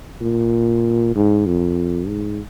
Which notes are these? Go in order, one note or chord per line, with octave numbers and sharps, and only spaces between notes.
A#2
G#2
F2
G#2